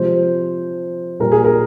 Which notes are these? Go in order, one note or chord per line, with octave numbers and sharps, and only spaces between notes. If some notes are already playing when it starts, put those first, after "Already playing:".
Already playing: C3 F3 G#3 C5
A#2 G3 A#4
G#4
A#4